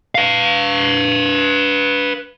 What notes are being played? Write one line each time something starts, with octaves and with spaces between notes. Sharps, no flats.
B4 F5